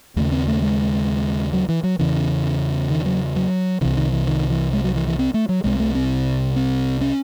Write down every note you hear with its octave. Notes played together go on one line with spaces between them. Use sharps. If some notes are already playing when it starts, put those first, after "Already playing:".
D#2 C#3 A3
C4
A3
G#3
F#3
E3
F#3
E2 C#3 E3
D#3
F#3
F#3
C2 C3 E3
D#3
E3
D#3
E3
G#3
F#3
E3
E3
C4
A3
F#3
C2 C3 G#3
A3
C4
C4
C#4